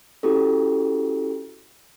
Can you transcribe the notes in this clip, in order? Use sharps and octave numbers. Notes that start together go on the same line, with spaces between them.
C#4 E4 F#4 G4 A4